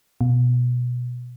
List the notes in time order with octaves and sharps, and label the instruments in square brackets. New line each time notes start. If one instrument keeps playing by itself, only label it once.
[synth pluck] B2